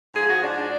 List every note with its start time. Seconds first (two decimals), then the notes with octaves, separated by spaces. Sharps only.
0.15 G#2 F3 G#4
0.29 F#4
0.43 D4
0.57 D4